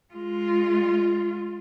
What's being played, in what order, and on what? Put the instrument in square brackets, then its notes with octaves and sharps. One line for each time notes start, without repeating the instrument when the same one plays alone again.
[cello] G#3 F4